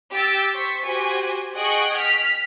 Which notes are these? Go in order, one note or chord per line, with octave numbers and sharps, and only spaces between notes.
G4 E6 A6
C5 C#6 B6
F#4 G4 C5 G#5
G#4 D#5 F#5 G5 C#6 F#6
F6 B6